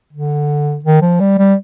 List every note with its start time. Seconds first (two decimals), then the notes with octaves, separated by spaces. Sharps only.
0.13 D3
0.84 D#3
1.02 F3
1.20 G3
1.38 G3